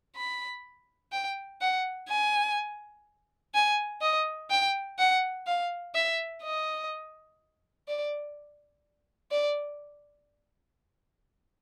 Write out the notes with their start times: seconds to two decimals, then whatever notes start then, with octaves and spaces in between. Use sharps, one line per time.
0.16 B5
1.12 G5
1.61 F#5
2.09 G#5
3.54 G#5
4.01 D#5
4.50 G5
4.99 F#5
5.47 F5
5.95 E5
6.43 D#5
7.88 D5
9.31 D5